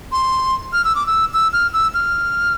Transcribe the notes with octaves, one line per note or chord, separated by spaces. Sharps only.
C6
F6
E6
D6
E6
E6
F6
E6
F6